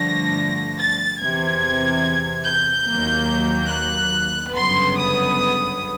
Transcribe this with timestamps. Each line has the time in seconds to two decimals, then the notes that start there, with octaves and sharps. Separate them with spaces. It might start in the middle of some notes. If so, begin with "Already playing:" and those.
Already playing: G2 D3 F3 A3 A#6
0.79 A6
1.21 E2 C3 E3 G#6
2.46 G6
2.87 D#2 D#3 F#3 A#3
3.70 F#6
4.54 G1 F#2 C#3 F#3 B3 C6
4.96 D#6